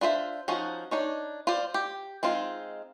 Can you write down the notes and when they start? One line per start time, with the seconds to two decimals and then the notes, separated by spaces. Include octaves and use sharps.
0.01 D4 F4 C5 E5
0.48 F3 C#4 D#4 F#4
0.91 D4 D#4 C#5
1.47 F4 C5 D5
1.74 G4
2.23 G#3 C4 D#4 F4